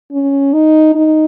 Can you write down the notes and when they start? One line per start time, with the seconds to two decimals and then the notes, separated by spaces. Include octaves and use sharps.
0.12 C#4
0.53 D#4
0.95 D#4